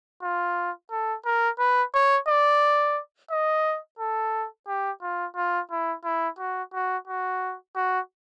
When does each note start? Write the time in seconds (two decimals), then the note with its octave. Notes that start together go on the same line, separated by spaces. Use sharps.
0.23 F4
0.91 A4
1.25 A#4
1.59 B4
1.94 C#5
2.28 D5
3.31 D#5
3.99 A4
4.67 G4
5.02 F4
5.36 F4
5.71 E4
6.04 E4
6.39 F#4
6.74 F#4
7.07 F#4
7.76 F#4